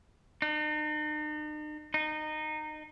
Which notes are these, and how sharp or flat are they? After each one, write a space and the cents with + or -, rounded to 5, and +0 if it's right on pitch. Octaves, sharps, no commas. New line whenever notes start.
D#4 -45
D#4 -20